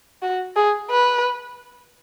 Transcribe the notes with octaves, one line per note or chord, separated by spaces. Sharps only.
F#4
G#4
B4